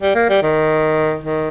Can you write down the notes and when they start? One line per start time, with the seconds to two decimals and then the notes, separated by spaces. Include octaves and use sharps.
0.02 G3
0.15 A#3
0.29 G3
0.43 D#3
1.23 D#3